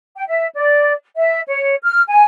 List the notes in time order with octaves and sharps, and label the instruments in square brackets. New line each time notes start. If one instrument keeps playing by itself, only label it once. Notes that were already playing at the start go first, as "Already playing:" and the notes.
[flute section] G5
E5
D5
E5
C#5
F6
G#5